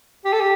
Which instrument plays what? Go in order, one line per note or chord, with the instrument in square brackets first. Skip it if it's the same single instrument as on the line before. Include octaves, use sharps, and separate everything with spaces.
[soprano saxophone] G4
A4
G4